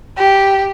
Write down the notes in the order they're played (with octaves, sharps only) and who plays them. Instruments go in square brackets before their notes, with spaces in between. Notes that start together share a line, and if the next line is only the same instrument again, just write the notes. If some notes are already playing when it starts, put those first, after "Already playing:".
[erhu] G4